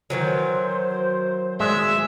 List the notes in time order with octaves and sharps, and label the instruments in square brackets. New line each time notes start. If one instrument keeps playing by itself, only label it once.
[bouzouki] D#3 E3 F#3 [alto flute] C5
[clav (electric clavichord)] G#3 D5 [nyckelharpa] E5